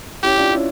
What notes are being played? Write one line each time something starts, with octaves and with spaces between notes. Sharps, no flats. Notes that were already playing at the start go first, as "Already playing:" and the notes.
C#4 E4 G4
D4 F4
C#4 E4